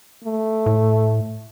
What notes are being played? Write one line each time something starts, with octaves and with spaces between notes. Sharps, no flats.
A3
A2